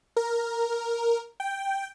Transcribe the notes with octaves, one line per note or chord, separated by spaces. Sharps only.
A#4
G5